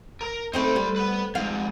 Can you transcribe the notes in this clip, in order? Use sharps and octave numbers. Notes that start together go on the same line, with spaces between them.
A#4
A3 C4 D#4 C5 B5
G3
B3 B4
F2 G#2 F5